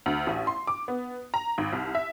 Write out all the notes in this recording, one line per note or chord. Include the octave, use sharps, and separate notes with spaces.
D2
A1
C6
D6
B3
A#5
G#1
C2
E5